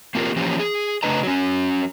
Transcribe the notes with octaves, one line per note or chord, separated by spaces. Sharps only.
A#3 C4 F4 G4 A#4
E3 F3 A#3 C#4 G4
G#4
C#3 A3 D4 B4 D#5 A#5
F#3 C#4